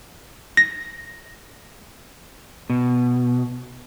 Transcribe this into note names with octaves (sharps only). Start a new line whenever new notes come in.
A#6
B2